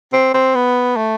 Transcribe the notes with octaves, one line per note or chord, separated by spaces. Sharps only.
C4
C4
B3
A3